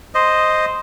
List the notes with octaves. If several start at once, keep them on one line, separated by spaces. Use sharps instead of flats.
C5 D#5